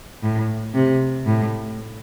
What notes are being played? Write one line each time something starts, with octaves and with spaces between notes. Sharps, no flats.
A2
C3
A2